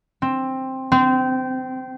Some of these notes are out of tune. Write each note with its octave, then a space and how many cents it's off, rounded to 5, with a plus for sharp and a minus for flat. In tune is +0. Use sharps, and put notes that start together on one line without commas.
C4 +10
C4 -25